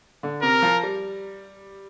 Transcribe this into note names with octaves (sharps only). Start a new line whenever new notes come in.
D3
C3 A#4
F3
G3